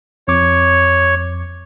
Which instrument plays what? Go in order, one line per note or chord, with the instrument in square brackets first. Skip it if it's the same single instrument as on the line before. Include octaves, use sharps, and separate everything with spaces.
[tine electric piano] F2 D6 [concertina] C#5